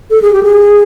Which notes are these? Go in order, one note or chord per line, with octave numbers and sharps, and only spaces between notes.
A4
G#4
G4
G#4